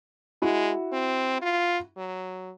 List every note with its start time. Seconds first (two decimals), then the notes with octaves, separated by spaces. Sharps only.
0.42 G#3 E4 F#4
0.92 C4
1.42 F4
1.97 F#3